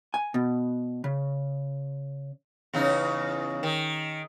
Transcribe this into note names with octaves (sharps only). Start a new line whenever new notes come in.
G#5
B2
C#3
E2 C#3 D#4
D#3